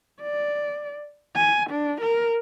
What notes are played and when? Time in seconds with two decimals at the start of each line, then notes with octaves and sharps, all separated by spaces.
0.21 D5
1.36 G#5
1.70 D4
2.01 A#4